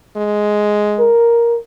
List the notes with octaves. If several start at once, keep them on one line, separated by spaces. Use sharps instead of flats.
G#3
A#4